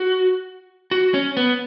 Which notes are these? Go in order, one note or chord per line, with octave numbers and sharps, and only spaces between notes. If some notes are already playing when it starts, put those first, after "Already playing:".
Already playing: F#4
F#4
C#4
B3